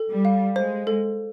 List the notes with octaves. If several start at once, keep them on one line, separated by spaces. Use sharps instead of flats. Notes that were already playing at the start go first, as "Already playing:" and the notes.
Already playing: A4
G3
F5
G#3 C5
A4